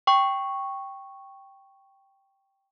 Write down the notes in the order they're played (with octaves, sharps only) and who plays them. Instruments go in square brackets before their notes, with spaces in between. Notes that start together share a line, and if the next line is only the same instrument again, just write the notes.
[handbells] G5 C#6